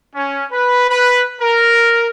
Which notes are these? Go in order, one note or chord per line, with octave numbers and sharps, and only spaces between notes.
C#4
B4
B4
A#4